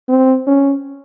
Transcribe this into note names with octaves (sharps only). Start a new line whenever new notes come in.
C4
C#4